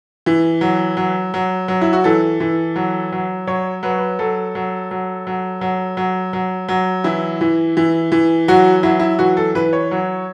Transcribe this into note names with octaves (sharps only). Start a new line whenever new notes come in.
E3
F#3
F#3
F#3
F#3
E4
F#4
E3 A4
E3
F#3
F#3
F#3 C#5
F#3 B4
C#5
B4
F#3 A4
F#3
F#3
F#3
F#3
F#3
F#3
F#3
E3 E4
E3
E3
E3
F#3 F#4
F#3 E4
E4
E3 F#4
A4
E3 B4
C#5
F#3